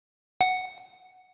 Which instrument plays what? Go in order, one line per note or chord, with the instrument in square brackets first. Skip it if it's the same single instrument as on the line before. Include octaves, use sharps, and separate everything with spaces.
[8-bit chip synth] F#5